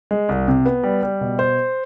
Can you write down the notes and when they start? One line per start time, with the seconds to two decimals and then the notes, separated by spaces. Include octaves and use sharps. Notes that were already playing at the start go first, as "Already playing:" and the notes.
0.11 G#3
0.29 C2
0.48 C3
0.65 B3
0.83 G3
1.03 G3
1.21 B2
1.39 C5